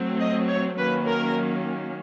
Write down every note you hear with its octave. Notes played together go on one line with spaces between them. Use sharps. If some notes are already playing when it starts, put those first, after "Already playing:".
Already playing: F#3 A3 C4
D#5
C#5
D#3 F#3 A#3 C#4 B4
A#4